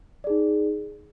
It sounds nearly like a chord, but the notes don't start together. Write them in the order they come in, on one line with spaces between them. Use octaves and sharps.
D5 G#4 D#4